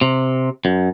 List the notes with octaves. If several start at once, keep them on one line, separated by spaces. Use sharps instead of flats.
C3
F#2